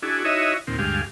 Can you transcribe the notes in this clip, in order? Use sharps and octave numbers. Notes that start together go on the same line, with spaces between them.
D4 E4 F#4 G#4
D#4 E4 F#4 C#5 D#5 E5
D#2 A#2 C4
D2 G2 G#3 G4 F5